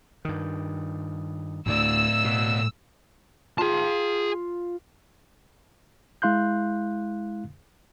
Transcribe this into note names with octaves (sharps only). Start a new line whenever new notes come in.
G2 D#3
D2 A2 D5 E6
B2
F4 G#4 F5 A5
G#3 E4 F5 C6 F#6 G6